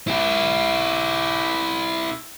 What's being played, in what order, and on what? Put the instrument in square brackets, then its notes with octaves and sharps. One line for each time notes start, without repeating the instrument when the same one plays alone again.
[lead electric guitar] E4 G4